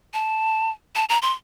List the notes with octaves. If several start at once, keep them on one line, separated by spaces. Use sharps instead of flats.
A5
A5
A#5
C6